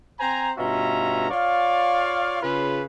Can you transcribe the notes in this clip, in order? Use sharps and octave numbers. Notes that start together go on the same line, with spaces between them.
C4 C5 G#5 A#5
G2 B2 C#4 F4 E5 A#5
F4 C#5 D5 F5
C#3 F4 B4